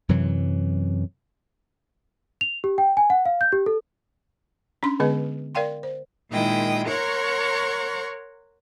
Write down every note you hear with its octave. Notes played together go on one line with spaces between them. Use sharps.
F#2 C3 E3 F#3
F7
G4
G5
G#5
F#5
F5
G6
G4
A4
C#4 D4 C6
D3 G#3 B3 G#4 B4 D#5
A#4 D5 F5 G5 C6
C5
A#2 D#3 G#3 E4 G5 D#6
A#4 C#5 F#5 A#5 C6 C#6